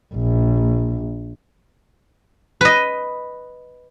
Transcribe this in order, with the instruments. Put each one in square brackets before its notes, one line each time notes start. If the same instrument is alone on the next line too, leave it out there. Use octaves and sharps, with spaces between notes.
[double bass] A#1
[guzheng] B4 D#5